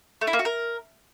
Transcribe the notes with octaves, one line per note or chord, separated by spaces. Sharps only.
A3
E4
A#3
F#4
A#4